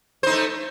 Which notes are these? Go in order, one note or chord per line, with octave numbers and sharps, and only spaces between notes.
A3 D#4 C5